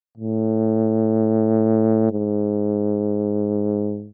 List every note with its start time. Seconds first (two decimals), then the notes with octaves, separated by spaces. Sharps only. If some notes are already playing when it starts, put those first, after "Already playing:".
0.17 A2
2.12 G#2